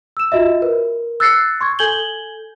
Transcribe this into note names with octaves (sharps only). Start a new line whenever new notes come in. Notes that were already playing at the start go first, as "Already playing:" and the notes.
E6 E7
F4 F#4 D#5 E5
A#4 B4
E6 F#6 A6 A#6 C7 C#7
C6 C#6 G#6
A4 G#5 G6 G#6 F#7 G7